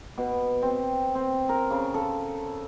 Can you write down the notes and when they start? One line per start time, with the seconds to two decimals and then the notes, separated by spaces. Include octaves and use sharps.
0.18 B2
0.62 C4
1.15 C4
1.49 A#4
1.70 C#3
1.94 A4